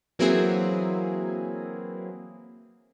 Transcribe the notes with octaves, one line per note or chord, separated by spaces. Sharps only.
E3 F#3 A#3 C4 E4 G#4